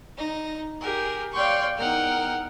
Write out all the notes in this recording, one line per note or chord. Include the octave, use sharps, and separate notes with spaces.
D#4 A#6
G4 G#4 A#4
C#5 D5 F5 G5 C6 C#6
E2 D#4 A#4 F#5 G5 F6